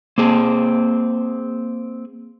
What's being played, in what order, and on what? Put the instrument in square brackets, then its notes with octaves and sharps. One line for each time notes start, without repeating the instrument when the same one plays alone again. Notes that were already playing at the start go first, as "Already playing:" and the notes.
[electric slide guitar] A#3 C4 G#4